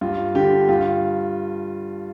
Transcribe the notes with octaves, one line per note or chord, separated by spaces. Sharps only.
G2 F4
D3 G4
G2 F4